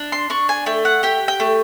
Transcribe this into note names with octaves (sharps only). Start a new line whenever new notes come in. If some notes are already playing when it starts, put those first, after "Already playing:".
Already playing: D4
C6
D4 C#6
G#5
A3 G5
F#5
G4 G5
G5
A3